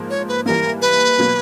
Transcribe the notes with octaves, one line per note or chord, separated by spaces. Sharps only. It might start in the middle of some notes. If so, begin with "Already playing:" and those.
Already playing: G#2 F3 A#3
C#5
B4
E3 G3 A#3 A#4
B4
B2 F#3 A#3